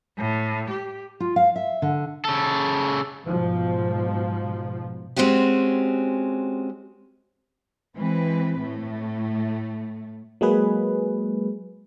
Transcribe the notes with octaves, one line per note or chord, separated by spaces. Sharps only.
A2
G4
F4
F5
E5
D3
C#3 A4
G#2 B2 F3
G#3 C4 C#4 F#4 G4
E3 G#3 C4 B4
A2 A3
F#3 G#3 A#3 G#4 B4